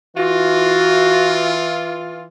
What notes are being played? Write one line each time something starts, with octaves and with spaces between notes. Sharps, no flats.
E3 F4 F#4